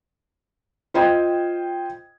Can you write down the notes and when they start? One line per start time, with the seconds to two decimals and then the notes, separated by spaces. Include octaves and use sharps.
0.94 F4 C5 D#5 G5 G#6